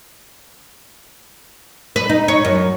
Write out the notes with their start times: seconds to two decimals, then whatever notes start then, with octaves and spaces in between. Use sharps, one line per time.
1.96 B4
2.09 D#4
2.28 C#5
2.45 F#2